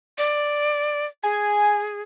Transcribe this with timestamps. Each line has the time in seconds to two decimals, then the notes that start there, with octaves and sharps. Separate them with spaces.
0.18 D5
1.23 G#4 G#5